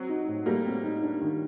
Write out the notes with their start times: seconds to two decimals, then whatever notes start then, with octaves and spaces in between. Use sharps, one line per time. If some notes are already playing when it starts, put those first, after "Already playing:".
Already playing: F#3 C4
0.09 D#4
0.27 A2
0.46 G3 A3 A#3
0.65 C4
0.84 D#4
1.03 D4
1.21 D#3